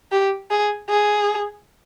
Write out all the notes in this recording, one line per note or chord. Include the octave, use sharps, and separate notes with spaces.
G4
G#4
G#4